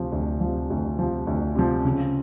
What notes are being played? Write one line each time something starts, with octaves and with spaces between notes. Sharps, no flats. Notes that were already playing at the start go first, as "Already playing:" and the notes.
Already playing: D2 C3 F3
D2
F3
C3
D2
C3 F3
D2
C3 F3
C#3